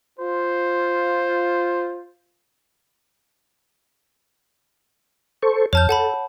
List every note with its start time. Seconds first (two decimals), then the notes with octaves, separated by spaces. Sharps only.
0.19 F4 C5
5.42 A4 C5 C#6
5.73 F2 C#5 A5 F6 G6
5.89 A4 F#5 A5 B5